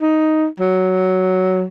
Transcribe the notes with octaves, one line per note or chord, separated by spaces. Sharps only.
D#4
F#3